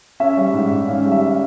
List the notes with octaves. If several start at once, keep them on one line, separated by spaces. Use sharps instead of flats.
C#4 E5
G3
G#2
G#2
C#4 F5
G3
E5